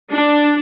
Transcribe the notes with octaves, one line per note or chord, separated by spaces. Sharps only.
D4